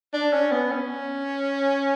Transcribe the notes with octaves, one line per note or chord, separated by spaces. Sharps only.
D4
C#4
B3
C#4